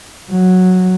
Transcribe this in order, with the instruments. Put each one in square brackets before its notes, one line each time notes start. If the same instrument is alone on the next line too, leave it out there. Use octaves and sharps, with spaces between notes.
[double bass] F#3